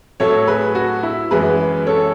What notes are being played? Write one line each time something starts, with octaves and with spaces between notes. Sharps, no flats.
A2 F#3 A3 A4 C#5
G#4 B4
F#4
E4
F#2 E3 G#3 G#4 B4
A4 C#5